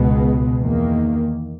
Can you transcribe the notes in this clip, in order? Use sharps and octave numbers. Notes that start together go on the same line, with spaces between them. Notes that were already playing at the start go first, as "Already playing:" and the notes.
Already playing: C#2 B2 G#3 B3
E2 D#3 A#3